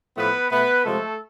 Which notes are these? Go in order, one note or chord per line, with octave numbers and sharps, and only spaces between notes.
A2 F3 A3 B3 B4
B2 A3 B3 B4
C3 F3 G#3 A3 A4